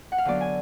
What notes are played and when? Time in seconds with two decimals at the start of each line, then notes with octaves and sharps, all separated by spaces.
0.12 F#5
0.18 F5
0.25 D3 F#3 B3 D5
0.41 G#5